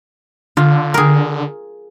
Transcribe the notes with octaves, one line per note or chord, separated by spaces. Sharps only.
D3 F4
G#4 A#4